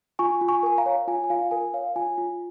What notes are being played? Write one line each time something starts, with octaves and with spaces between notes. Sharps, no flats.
F4 G#5 C#6
F4
G#5 C#6
A#4 G#5
F5 A#5
C#5
F4 G#5
G#5
F4 F5
A#4 G#5
C#5 F5
F4 G#5
F4